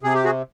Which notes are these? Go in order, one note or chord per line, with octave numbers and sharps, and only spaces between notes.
C3 G#4
G4
F#4 G#4